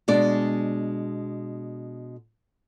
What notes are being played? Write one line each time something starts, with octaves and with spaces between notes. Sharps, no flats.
B2 G#3 D4 D5